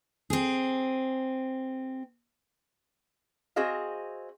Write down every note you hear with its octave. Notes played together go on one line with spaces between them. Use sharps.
C4 G#4
C4 F#4 G#4 D#5 F5